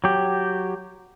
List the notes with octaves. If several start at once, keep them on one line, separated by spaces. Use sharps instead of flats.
F#3 G4